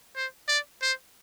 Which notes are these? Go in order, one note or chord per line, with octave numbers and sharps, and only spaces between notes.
C5
D5
C5